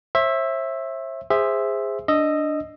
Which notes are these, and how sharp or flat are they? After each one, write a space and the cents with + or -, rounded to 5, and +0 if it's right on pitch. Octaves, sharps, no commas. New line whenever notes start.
C5 +45 E5 +0
G#4 -20 C5 +0 E5 +0
D4 +0 D#5 +0 E6 +10